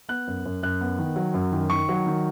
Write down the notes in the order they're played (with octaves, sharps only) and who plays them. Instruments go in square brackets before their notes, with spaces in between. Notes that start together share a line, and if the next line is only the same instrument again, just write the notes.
[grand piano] B3 F#6
F#2
F#2
F#2 F#6
B3
D#3
F#3
F#2
D#3
D#3 C#6
F#3
D#3